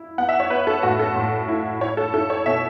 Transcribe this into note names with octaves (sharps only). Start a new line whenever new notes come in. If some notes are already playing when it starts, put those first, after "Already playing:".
Already playing: E4
B3 F#5
E5
C#5
B3 B4
A4
A2 F#4
A4
A2
E4
E4 C#5
A4
E4 A4
C#5
B2 E5